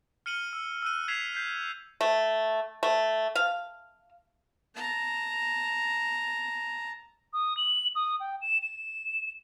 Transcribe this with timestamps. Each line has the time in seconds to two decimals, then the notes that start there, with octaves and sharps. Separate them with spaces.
0.26 F6 C#7 D#7 F#7 G7
0.53 E6
0.83 E6 F#6 D#7
1.08 G#6 B6 C7 E7 F7
1.34 G6 B6 C7
2.01 A3
2.83 A3
3.35 F5
4.75 A5 A#5
7.33 D#6
7.57 F#7
7.95 D#6
8.20 G5
8.42 E7
8.62 E7